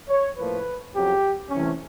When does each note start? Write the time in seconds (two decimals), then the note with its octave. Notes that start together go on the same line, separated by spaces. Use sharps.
0.09 C#5
0.38 A2 F3 A#3 B4
0.94 F2 C#3 F#3 G4
1.50 C2 C3 E3 A3 C#4